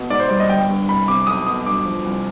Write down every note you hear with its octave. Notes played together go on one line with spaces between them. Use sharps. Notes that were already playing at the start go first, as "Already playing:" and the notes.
Already playing: B2
G#2 D5
C5
G3 D5
D#5
G1 G5
G2
C2 B5
C3 D6
B1 D#6
B2 D#6
G2 D6
F3
C2